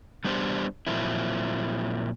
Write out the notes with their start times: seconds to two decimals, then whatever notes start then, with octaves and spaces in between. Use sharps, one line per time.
0.25 G3 B3 D4 G4 C5
0.87 A#2 F3 F#3 A#3 C4 E4